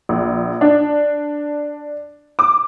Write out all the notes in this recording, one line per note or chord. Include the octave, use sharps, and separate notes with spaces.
A#1
D4
D6